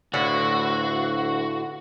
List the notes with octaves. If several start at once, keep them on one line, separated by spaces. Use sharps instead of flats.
D2 A2 D3 E4 F#4 B4 F5 C#6